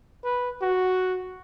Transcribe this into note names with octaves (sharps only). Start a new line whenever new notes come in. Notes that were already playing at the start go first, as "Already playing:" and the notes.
B4
F#4